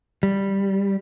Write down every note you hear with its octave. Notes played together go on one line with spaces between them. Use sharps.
G3